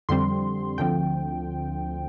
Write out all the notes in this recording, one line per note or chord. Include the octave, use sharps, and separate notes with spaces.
F2 D3 G3 C4 C6
D2 D3 F3 C4 G5